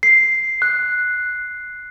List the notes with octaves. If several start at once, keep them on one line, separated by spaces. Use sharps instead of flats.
C7
F#6